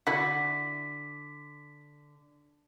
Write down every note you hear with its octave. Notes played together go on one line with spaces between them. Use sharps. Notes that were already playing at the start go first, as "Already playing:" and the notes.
D3 E4 F#4 B6